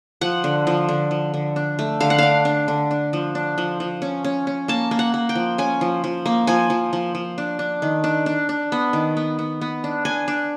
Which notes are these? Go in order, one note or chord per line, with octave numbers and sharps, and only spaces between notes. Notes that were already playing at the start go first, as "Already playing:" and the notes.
F3 F#5
D3
F3
D3
F3
D3
D4
A3
D3 F5
F#5
D4 F5
D4
D3
D4
F3
D4
F3
F3
C#4
C#4
C#4
A#3 A5
A#3
F#5
A#3
G5
F3
C#4 G#5
F3
F3
A#3
F3 G#5
F3
F3
F3
D4
D4
D#3
D4
D4
D4
B3
D#3
B3
B3
B3
D4
D4 G#5
D4